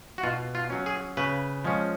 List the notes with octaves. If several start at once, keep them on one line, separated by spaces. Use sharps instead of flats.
F#4
B2 F4
F4
F#3 C#4
G#4
C#3 B4
F3 G#3 C#4